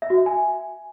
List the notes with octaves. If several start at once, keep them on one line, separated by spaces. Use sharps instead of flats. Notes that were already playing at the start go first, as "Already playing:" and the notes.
E5
F#4
E5
G#5